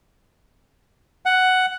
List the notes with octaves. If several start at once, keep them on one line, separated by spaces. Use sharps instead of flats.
F#5